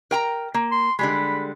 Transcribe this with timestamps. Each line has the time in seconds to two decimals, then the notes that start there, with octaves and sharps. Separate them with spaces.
0.11 A#4 G5 A#5
0.54 A#3
0.72 C6
0.99 D3 G3 G#3 B5